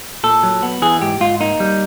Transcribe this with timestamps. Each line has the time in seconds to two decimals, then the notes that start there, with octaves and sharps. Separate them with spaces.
0.23 A#2 A4
0.43 F#3
0.63 B3
0.82 E3 G#4
1.02 G#2 G4
1.20 G#2 F4
1.40 A#3 D#4
1.60 G3